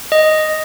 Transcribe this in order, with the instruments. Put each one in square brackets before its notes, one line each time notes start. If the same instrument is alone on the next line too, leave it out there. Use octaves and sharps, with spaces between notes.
[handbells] D#5